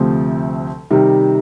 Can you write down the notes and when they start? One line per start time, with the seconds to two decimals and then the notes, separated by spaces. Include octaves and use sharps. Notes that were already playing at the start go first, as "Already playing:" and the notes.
Already playing: D2 C3 F3 A3 C4
0.91 C3 D#3 G3